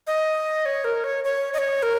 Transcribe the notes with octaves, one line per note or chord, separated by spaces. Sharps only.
D#5
C#5
A#4
C#5
C#5
D#5
C#5
A#4